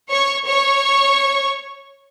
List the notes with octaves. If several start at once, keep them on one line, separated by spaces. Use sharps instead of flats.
C#5 C#6
C#5 C#6